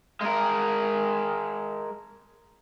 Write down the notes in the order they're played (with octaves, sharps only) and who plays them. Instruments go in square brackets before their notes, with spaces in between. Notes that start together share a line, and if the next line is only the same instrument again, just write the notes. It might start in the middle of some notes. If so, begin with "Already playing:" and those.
[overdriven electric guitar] G#3 A#4